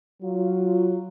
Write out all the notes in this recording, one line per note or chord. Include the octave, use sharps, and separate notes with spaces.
F#3 F4